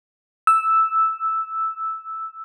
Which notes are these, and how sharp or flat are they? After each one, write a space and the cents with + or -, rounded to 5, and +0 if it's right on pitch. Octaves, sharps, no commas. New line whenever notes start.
E6 -5